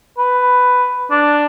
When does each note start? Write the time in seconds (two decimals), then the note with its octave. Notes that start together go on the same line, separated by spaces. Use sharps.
0.18 B4
1.10 D4